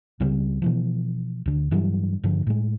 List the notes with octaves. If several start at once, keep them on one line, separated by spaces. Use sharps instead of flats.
C#2 C#3 G3 C4
B2 E3 F3
D2 D3
G2 E3 F#3 G3
G2 D3 F3
A2 G#3